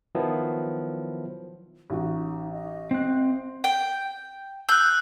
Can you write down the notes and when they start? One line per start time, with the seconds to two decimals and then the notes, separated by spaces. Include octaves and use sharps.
0.15 D#3 F3 F#3 B3 E4
1.90 A1 D#4 F#4
2.53 D#5
2.91 C4 F#6
3.64 G5
4.69 E6 F#6 G6